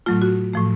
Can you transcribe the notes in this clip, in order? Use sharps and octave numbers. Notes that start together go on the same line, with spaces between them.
A2 F#3 A3 F4
F#4
A2 F3 A3